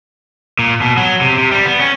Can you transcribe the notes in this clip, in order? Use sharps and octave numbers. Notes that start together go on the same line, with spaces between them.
A#2
B2
F#3
C3
C3
G3
B3
C#4